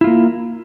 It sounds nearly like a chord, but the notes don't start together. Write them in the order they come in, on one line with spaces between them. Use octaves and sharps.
E4 F4 A#3